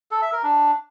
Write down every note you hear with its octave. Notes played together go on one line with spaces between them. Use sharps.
A4
E5
A#4
D4